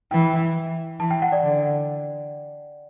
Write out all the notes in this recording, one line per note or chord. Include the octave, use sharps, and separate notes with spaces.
E3 G5
E3 A5
G5
F#5
D5
D3